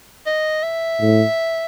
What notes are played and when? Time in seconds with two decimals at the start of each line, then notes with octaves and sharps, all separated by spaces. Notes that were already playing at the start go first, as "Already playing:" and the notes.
0.26 D#5
0.63 E5
1.01 A2